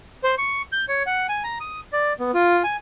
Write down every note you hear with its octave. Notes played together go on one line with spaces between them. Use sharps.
C5
C#6
G6
C#5
F#5
G#5
A#5
D#6
D5
B3
F4
G#5